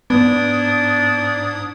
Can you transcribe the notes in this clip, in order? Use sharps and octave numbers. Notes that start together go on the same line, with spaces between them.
G#2 B3 D4 D#6 G#6